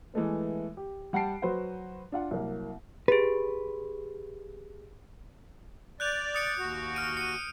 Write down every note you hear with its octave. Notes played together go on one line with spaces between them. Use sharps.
E3 G#3 A3 B3
G4
G3 F#5 G5 A5 C7 D7
F#3 F#4 B4 C5 F#5
D4 F4 F#5
C2 F#3 A#3
G4 G#4 B4
D5 F#6 G6 F7
D#6 C#7 D7
D#2 F#4
F6 D7 D#7
C#7 D#7